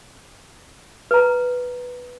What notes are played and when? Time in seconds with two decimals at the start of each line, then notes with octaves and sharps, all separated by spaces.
1.11 B4 A#5